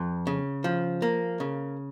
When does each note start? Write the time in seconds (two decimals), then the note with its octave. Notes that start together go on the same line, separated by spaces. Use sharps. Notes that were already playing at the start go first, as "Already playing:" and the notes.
Already playing: F2
0.27 C#3
0.64 F3
1.02 A#3
1.40 C#3